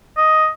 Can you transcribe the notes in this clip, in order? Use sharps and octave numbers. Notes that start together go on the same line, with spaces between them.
D#5